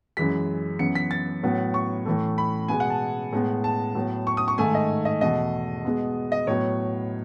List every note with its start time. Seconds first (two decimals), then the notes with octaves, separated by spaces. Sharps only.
0.17 F#2 E3 G#3 B6
0.79 F#2 E3 B3 C#7
0.95 B6
1.11 A6
1.43 A2 F#3 B3
1.74 C#6
2.05 A2 E3 A3
2.38 B5
2.68 B2 G#3 B3 G#5
2.80 F#5
2.90 A5
3.33 A2 G#3 B3
3.64 A5
3.95 A2 F#3 B3
4.27 C#6
4.37 D#6
4.48 C#6
4.58 G#2 D#3 A3 G#5
4.75 D#5
5.05 D#5
5.21 E2 B2 A3 D#5
5.85 B2 G#3 B3
6.32 D#5
6.47 A2 F#3 B3 C#5